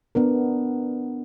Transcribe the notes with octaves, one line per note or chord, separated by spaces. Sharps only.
B3 D4 A#4